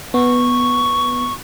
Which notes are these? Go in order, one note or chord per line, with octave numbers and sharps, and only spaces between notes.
B3 C#6